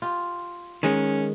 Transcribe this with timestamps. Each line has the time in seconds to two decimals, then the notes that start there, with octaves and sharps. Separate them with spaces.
0.02 F4 G4
0.83 D#3 G#3 C#4